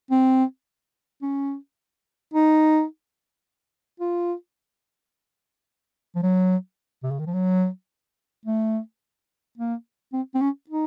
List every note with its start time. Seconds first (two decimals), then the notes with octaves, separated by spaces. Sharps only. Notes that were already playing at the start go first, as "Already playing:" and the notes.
0.11 C4
1.22 C#4
2.34 D#4
4.00 F4
6.16 F3
6.23 F#3
7.03 C3
7.11 C#3
7.19 D#3
7.27 F3
7.34 F#3
8.46 A3
9.58 A#3
10.13 C4
10.35 C4
10.41 C#4
10.69 D#4